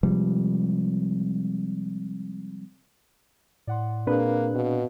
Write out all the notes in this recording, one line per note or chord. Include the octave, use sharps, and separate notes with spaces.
C3 F3 G3 G#3
A2 D5 F#5 C6
A#2 A#3 C4 D4 G#4 B4 F#6
B2 C4 F5